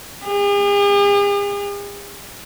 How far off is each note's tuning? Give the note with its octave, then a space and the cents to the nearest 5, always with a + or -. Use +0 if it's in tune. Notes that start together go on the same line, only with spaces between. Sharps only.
G#4 -45